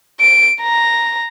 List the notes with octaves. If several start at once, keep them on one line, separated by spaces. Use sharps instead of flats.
D7
A#5